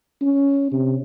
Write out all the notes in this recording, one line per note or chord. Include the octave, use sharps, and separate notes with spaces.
C#4
C3